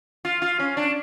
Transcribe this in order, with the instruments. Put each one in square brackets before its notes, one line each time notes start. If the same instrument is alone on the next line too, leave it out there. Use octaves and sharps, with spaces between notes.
[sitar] F4
F4
C#4
D4